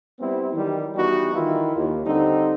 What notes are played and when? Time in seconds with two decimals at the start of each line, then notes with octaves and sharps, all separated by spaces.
0.20 G3 B3 C4 E4
0.54 D#3 E3 F#3 G3
0.95 E3 G3 B3 D#4 F#4
1.34 D#3 E3 E4 F4
1.76 D#2
2.05 D3 G3 C4 D#4